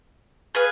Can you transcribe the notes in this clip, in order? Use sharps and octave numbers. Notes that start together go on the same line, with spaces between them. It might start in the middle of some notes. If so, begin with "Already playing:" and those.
G#4 B4 F5 G#5